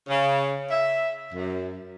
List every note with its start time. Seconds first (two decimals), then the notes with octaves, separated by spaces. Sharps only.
0.07 C#3
0.70 E5
1.33 F#2